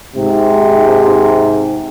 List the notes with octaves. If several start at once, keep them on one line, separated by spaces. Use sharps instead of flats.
G#2 C3